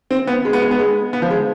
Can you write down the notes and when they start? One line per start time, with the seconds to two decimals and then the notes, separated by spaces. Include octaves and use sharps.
0.11 C4
0.27 B3
0.45 G#3
0.53 B3
0.62 G#3
0.71 B3
0.79 G#3
1.13 B3
1.22 F3
1.31 G#3